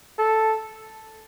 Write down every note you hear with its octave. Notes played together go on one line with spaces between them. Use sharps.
A4